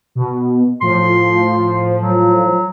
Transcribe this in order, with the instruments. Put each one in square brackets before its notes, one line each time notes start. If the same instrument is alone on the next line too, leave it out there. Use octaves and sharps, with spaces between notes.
[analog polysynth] B2
[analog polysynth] A2 F3 [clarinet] C6
[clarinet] F#3